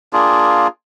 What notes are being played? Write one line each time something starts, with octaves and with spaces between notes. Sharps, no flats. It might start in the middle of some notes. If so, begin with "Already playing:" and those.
A#3 D4 F4 G#4